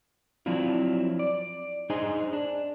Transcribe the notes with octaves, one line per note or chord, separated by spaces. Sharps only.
F3 F#3 C4 D4 E4 F4
D5
D4 D#4 G#4 C5 D#5 G#5
D4